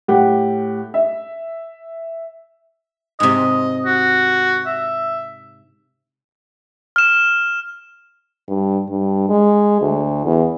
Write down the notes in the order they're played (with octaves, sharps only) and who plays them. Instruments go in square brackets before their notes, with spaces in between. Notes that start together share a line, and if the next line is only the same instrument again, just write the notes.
[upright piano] A2 G4 F#5
E5
[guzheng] G#2 C3 [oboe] D#5
[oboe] F#4
E5
[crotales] F6 E7
[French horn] G2
G2
G#3
D2
E2